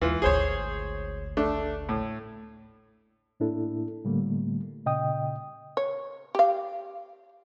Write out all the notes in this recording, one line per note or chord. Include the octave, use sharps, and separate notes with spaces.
D#2 E3 G#3 F4
G#1 D2 G#4 C5 C#5
A3 D4
A2
A2 A#3 D4 E4 A4
A2 D3 G3 A3 A#3
A#2 C#3 D#5 G5 D#6
C#5
G4 F5